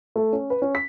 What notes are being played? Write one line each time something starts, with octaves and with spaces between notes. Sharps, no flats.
A3
C#4
B4
C#4
B6